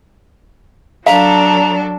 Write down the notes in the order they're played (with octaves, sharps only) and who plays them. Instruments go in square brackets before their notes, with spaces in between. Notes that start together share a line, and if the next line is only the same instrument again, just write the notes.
[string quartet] F#3 D4 A4 [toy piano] F5 [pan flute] A#5